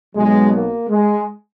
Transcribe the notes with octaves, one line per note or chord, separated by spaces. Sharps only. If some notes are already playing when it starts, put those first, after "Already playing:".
B1 B2 F#3 G#3
A#3
G#3